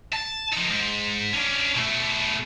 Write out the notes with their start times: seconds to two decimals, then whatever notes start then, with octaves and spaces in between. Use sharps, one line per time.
0.13 A5
0.52 F3 D#4
0.69 G#2
1.33 C#4 D4
1.75 B2 A3